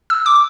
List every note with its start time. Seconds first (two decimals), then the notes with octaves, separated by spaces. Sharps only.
0.10 E6
0.26 D6